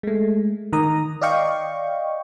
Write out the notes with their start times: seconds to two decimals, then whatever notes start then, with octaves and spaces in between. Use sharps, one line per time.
0.03 G#3 A3
0.73 D#3 A#5 D#6
1.21 D5 D#5 F5 G5 C#6